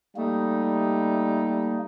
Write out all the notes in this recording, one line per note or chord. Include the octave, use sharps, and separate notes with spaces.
G3 A3 A#3 D#4